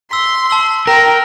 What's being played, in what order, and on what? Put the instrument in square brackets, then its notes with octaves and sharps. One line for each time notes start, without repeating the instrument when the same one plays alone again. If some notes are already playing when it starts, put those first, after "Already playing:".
[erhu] C6 [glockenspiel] E6 B6
[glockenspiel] A5 E6 F#7
[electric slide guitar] A#4 [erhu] G5 [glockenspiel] A#5